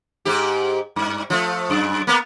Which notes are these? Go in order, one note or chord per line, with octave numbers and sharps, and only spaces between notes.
G#2 G4
G2
F3 A3
F#2
A#3 B3